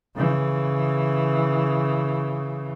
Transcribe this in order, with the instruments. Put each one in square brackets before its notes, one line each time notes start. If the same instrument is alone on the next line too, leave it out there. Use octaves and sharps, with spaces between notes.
[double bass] C#3 E3